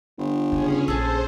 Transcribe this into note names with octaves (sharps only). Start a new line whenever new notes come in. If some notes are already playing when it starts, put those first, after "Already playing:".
G1
C#3 C#4 G#4
A#1 G#4 A4 C5